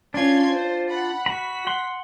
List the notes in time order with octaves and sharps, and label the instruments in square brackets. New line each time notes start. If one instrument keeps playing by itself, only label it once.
[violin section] C#4 C6 G#6 [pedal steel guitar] D4 F4
[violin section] C5
F#5 B5
[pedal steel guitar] F#4 B5 [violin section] B6
[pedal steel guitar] F#5 C6